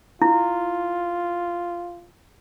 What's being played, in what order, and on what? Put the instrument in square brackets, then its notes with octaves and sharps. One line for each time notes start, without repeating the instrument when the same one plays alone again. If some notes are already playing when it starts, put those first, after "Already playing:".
[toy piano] E4 [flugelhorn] F4